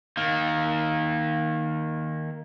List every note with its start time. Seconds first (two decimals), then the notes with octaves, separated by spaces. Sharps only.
0.17 D#3 A#3